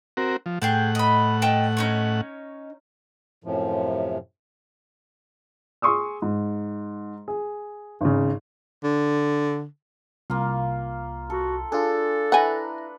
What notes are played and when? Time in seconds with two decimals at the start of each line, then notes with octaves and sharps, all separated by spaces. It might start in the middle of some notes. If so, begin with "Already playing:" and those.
0.17 C4 F#4 A#4
0.46 F3
0.62 A2 G#4 F#5 G5 A5
0.95 D#5 B5
1.42 D#5 G5 A5
1.77 C#4 D#4 C#5
3.44 F#2 A2 C3 F3
5.82 G#4 C6 C#6 D#6 E6
6.22 G#2
7.28 G#4
8.01 G#1 C#3
8.84 D3
10.30 C2 A#3 F4
11.30 F#4 A4
11.72 D4 F4 G#4 A4
12.32 E4 B4 F#5 G#5 A#5